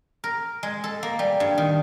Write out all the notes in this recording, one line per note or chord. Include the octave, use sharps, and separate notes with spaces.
A#4
G#3
A4
A#3
G3
G2
D#3